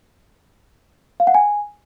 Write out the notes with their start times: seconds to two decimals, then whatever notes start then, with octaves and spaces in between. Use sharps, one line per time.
1.20 F5
1.27 F#5
1.34 G#5